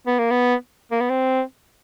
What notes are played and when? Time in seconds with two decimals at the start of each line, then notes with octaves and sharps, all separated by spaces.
0.07 B3
0.19 A#3
0.31 B3
0.91 A#3
1.00 B3
1.10 C4